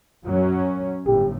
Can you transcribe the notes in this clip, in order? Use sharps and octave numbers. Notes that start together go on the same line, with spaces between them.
F#2 F#3 C#4
G1 A2 G4